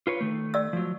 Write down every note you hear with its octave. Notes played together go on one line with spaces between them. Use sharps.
F4 B4 C#5
D#3 A3
D5 E6
F3 F#3